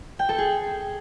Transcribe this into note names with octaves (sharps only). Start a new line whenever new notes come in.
G5
A4
G#4